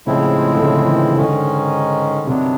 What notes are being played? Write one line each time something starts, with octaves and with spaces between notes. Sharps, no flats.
A2 C#3 F3 G#3 C4 E4
D3
C#3
E3
D#3
G#2 D3 D#3 G#3 C#4
G2 C3 D#3 F#3 B3 D4